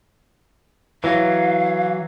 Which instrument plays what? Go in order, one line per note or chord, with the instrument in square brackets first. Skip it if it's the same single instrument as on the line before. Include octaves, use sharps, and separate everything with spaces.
[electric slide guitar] E3 F#3 [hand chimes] E4 B4 [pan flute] F5